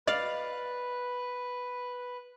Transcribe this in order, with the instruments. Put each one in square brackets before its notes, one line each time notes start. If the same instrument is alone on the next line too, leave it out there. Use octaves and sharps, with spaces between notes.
[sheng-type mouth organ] B4 [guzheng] D5 F5 [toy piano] D#5